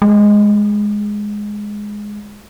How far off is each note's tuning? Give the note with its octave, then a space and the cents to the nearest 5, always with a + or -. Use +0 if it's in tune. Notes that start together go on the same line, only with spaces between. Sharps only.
G#3 +0